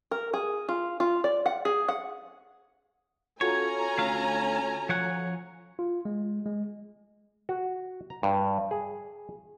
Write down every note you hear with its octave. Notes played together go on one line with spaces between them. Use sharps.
A#4
G#4
F4
F4
D5
F#5
G#4
F#5
C#4 F4 F#4 A4 C#5 G#5 A#5
D2 A3 F5
F3 C#5 F#5
F4
G#3
G#3
F#4
A#5
G2
G#4